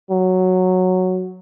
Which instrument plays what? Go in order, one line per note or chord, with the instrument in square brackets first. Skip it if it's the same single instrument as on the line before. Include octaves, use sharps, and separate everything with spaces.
[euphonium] F#3